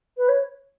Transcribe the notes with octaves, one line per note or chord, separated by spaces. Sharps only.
B4
C#5